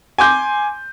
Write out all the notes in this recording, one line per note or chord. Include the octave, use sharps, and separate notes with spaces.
G#5 C6 D6 G6